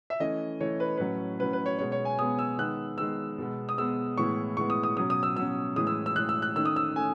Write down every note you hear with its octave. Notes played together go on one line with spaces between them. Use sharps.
E5
E3 A3 C#4 D#5
E3 A3 C#4 C#5
B4
A2 F#3 C#4 B4
A2 F#3 C#4 B4
B4
C#5
B2 G#3 B3 C#5
C#5
G#5
B2 G#3 B3 D#6
E6
D#3 G#3 B3 F#6
D#3 G#3 B3 E6
B2 G#3 B3
D#6
B2 G#3 B3 E6
A2 E3 G#3 B3 C#6
A2 E3 G#3 B3 C#6
D#6
D#6
B2 F#3 C#4 D#6
D#6
E6
B2 F#3 C#4 E6
A2 E3 G#3 D#6
E6
E6
A2 E3 G#3 F#6
E6
F#6
D#3 A3 C#4 E6
D#6
E6
A3 C#4 G#5